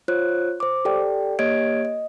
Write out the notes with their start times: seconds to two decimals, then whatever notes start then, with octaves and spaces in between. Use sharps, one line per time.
0.08 F4 C5 C#5 F#6
0.60 C5 D6
0.85 G4 A4 D5 G5
1.39 A#3 G4 C#5 D#5 G#6 D7
1.85 D#5